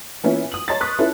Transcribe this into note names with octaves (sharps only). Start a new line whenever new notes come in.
E3 A#3 B3 C#4 E4 F4
D#6 F#7
C#5 D#5 A5 A#5 C6 A6
C6 C#6 D#6 F#6 A6 B6
C#4 E4 F4 A4 B4